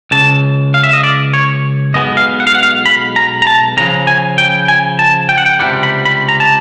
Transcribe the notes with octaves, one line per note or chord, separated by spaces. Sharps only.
C#2 C#3 A5
F5
E5
D#5
D5
C#5
B1 B2 G#3 B3 D#5
F5
F#5
F5
F#5
F5
B5
A#5
A#5
A5
D2 C#3 F3 A#5
G#5
G5
G#5
A5
G5
F#5
G5
C#2 C3 D#3 G3 F#5
B5
B5
A#5
A5